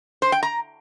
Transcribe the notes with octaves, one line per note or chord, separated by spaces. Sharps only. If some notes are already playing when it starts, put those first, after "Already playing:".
C5
G5
A#5